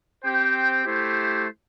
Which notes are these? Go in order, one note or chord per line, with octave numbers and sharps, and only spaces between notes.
C4 G4 C5 G5
A3 E4 G4 C5